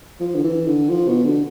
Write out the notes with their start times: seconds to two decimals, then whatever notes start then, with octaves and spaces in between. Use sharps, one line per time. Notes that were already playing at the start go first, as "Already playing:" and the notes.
0.20 F3
0.35 D3
0.44 E3
0.67 D3
0.90 F3
1.08 B2
1.25 D3